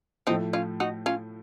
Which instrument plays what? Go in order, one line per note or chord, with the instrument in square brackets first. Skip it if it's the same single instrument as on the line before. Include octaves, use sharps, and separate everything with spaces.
[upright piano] A2 F3 A3 [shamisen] C4 D#4
[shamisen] C#4 F4
D#4 F#4
C#4 F4